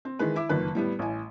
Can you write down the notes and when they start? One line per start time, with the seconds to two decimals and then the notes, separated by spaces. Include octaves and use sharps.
0.05 C4
0.19 D#3 E3 G#3 B4
0.36 E4 E5 D6
0.49 F#1 F2 D#3 B4
0.75 A2 G3 B3
0.99 A1 A2 G#5